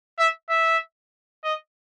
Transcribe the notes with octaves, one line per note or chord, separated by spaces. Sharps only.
E5
E5
D#5